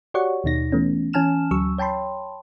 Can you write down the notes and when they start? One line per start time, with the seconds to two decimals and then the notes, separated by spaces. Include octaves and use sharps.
0.14 F#4 G4 C#5 D5 F#5 C#6
0.44 D#2 B2 D#4 A#6
0.72 E3 A3 B3 C#4
1.13 E3 C#4 G#5 A5 F6 E7
1.51 D2 F#3 C#6 E6
1.78 C#5 G5 A5 B5 C6